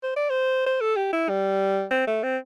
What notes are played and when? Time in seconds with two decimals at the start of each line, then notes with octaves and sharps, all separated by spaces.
0.03 C5
0.16 D5
0.30 C5
0.66 C5
0.81 A4
0.97 G4
1.13 E4
1.29 G3
1.91 C4
2.07 A3
2.23 C4